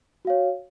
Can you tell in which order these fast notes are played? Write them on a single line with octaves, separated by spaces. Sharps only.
F#4 F5 C#5